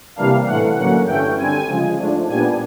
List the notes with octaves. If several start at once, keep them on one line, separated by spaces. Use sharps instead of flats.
C3 E3 G3 A#3 D4 F5
A2 E3 A3 F#5
D3 F#3 A#3 C#4 F#5
G2 E3 A3 C#4 G5
D3 G3 C4 G#5
C#3 F3 G#3
G#2 F3 A3 D4
A#2 G3 B3 D4 G#5